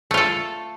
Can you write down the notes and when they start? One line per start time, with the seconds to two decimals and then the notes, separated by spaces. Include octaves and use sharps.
0.11 A3
0.14 F4
0.17 A4